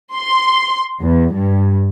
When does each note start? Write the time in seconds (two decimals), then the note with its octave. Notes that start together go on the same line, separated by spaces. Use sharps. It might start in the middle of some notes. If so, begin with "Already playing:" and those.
0.15 C6
1.02 E2
1.35 G2